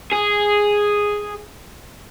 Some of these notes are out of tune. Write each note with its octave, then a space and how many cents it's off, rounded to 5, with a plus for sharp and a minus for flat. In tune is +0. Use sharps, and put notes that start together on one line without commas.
G#4 -5